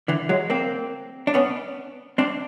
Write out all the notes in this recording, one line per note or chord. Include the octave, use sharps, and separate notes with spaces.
D3 E3
F#3 G#3
A#3 C4
D4
B3 C#4
C4 D4